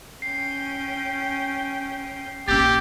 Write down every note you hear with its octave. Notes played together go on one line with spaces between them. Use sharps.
C#4 G5 C7
A#1 C#4 G4 E6 G6 A6